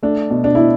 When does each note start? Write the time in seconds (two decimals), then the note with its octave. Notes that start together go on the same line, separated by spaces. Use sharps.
0.03 A3 D4
0.30 B2
0.44 D4
0.55 B2 E4